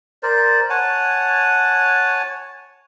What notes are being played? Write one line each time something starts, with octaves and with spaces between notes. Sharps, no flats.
A#4 C5 D5
C#5 F#5 G#5 A5